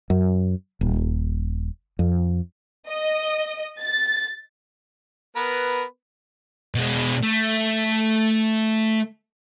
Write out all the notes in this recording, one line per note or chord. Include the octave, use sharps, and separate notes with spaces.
F#2
D#1
F2
D#5
A6
B3 A#4 B4
B2 G#3
A3